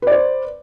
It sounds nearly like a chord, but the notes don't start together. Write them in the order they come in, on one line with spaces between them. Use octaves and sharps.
B4 D5 C5